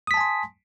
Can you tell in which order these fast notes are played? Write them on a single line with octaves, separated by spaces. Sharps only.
D#6 B6 A5 G#5 C6